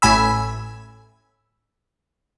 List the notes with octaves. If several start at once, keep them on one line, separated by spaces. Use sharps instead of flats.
A1 A2 G#5 B5 E6